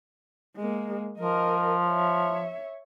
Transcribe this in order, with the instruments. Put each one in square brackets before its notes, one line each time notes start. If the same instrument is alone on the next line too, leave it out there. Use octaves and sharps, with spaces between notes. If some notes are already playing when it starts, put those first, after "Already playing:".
[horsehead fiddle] G#3 A#3
[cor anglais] F3 [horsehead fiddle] A#4 D#5
[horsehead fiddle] C#5 E5